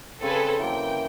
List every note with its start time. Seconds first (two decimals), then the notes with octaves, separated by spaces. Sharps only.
0.21 C#3 C4 G#4 A4 B4 C#5
0.59 E3 F#3 A#3 G5